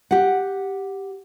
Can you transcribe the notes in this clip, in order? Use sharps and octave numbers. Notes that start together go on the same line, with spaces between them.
G4 F#5